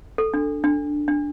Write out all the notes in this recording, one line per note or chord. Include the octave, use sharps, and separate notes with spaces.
A4
D4
D4
D4